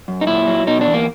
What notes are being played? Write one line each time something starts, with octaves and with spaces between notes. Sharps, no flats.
F#2
D#4
A#2 E4
F#3
B2 D#4
D4
E2
A#3